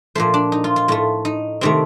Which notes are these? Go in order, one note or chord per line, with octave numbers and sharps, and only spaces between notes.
A#2 F3 A3 C5
D4
D#4
F4
F4
A2 A3 F4
D#4
C3 D#3 A3 C4